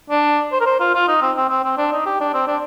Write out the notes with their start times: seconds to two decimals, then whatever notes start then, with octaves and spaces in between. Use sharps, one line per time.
0.10 D4
0.52 C5
0.61 A#4
0.66 C5
0.80 F4
0.95 F4
1.08 D#4
1.22 C4
1.36 C4
1.50 C4
1.64 C4
1.77 D4
1.92 D#4
2.06 G4
2.21 D4
2.34 C4
2.47 D4